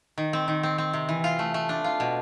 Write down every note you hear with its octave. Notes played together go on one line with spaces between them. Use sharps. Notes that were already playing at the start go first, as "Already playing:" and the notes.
D#3
C4
D#3
C4
C4
C3
E3
F4
A3
A3
D4
F4
B2